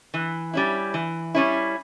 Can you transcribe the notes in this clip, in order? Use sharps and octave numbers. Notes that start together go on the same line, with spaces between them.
E3
G3 C#4 E4
E3
G3 C#4 E4